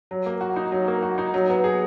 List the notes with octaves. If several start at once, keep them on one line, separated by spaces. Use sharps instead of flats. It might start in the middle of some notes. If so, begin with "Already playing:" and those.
F#3
A#3
F#4
D#4
F#3
A#3
F#4
D#4
F#3
B3
G#4